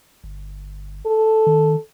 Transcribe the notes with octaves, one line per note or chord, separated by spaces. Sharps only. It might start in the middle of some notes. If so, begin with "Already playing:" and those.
G1
A4
D#3